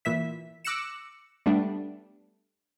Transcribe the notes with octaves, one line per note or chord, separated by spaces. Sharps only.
A#2 E3 E5 B6
D6 E6 F#6 A#6 C#7 E7
G3 A3 B3 D4